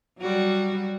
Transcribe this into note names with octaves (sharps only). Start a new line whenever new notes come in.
F#3 G3 F#4